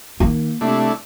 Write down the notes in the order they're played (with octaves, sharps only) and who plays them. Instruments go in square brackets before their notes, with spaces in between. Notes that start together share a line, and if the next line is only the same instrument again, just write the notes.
[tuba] D#3 [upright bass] A#3
[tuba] C3 [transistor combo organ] A3 D4 E4